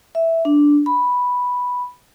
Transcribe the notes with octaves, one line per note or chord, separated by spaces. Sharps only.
E5
D4
B5